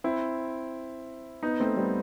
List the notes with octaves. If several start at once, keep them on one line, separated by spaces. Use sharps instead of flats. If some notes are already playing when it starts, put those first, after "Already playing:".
C4 E4
B3 D#4
A3 C4
G3 B3